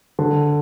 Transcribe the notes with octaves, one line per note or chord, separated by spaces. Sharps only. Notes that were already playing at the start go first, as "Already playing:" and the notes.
D3